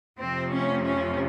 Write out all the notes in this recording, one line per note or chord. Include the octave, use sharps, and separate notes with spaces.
F2 C3 F3 A3 C4
C#4
C#4